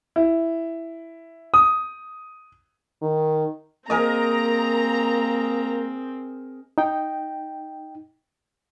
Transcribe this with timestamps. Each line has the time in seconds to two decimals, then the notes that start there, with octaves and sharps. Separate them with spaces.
0.16 E4
1.54 D#6
3.02 D#3
3.90 A#3 C4 G#4 A#4 D#5 A#5
6.78 D#4 G5